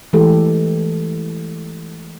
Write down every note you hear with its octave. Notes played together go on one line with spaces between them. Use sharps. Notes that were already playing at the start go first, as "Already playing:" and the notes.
E3 G#3 A3 G4 A4